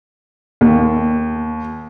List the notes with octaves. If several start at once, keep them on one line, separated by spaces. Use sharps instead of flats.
D#2